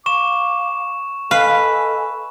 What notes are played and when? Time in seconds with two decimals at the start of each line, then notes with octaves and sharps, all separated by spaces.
0.06 F5 C#6 D6 E7
1.31 A4 B4 D#5 F5 G#5